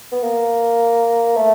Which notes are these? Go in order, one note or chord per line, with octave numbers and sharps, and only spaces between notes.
B3
A#3
A3